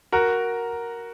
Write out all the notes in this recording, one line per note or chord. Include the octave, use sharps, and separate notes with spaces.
F#4 A#4